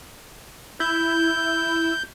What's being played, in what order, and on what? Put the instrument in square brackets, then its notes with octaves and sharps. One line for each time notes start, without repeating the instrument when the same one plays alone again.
[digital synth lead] E4 [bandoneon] G6